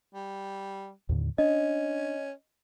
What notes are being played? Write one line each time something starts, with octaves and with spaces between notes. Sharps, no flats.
G3
D#2 A2 D3
C#4 D4 D#5